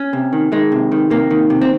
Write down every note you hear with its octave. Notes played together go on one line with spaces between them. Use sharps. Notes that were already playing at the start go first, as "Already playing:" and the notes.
Already playing: C#4
C3
D#3
D#3 G#3
C3
D#3
C3 A#3
D#3
C3
C4